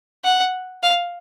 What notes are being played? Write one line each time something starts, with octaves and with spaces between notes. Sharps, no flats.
F#5
F5